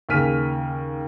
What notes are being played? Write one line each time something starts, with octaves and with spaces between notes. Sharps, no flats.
D#2 C#3 G#4 F6 B6 D#7